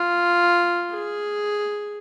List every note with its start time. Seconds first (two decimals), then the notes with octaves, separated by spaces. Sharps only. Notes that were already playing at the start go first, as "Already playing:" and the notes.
Already playing: F4
0.91 G#4